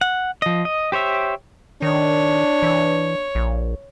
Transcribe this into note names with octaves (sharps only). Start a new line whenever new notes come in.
F#5
F3 D#5
D#5
G4 C5 C#5 E5
D#3 D4 C#5
E3
A#1